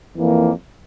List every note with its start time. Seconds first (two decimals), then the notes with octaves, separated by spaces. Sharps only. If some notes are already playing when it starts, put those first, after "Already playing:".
0.17 F2 E3 A#3